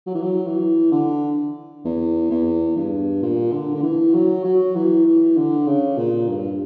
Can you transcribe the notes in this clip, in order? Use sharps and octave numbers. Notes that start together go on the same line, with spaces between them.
F#3
E3
F#3
E3
D3
E2
E2
G2
A#2
D3
D3
E3
F#3
F#3
E3
E3
D3
C#3
A#2
G2